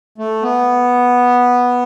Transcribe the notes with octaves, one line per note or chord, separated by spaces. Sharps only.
A3
B3